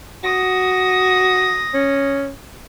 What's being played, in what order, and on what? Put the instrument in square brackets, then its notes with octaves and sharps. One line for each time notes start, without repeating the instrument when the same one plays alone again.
[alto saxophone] F#4 [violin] D#6 A#6
[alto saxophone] C#4